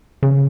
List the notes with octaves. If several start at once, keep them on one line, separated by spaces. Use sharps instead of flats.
C#3